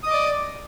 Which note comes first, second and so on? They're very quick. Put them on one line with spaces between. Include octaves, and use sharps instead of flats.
D#6 D#5 D6 D5